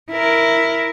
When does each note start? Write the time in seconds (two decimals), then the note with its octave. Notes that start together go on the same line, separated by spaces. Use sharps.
0.11 E4 A#4